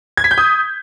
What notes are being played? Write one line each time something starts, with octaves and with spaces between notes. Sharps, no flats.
G#6
B6
G6
D#6